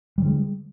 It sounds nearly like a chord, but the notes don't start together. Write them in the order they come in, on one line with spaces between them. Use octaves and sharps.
G3 D3 G#3